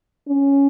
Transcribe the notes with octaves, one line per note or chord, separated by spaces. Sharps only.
C#4